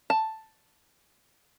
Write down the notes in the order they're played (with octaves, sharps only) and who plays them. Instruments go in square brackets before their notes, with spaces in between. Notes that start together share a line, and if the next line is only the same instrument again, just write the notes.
[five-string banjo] A5